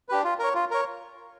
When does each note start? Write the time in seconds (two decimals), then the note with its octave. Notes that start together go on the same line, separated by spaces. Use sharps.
0.09 D4 G4 B4
0.24 F4
0.39 A#4 C#5
0.55 F4
0.71 A#4 C#5